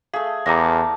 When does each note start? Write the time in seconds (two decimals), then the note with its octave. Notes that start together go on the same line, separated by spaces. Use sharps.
0.14 A3 G#4 F5
0.46 E2 F5 A5 A#5 D6 A#6